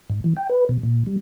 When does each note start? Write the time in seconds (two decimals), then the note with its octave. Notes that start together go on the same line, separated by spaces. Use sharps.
0.10 G#2
0.24 E3
0.37 G5
0.49 B4
0.69 B2
0.83 A#2
1.06 G3